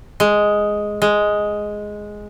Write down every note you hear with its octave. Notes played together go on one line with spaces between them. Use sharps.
G#3
G#3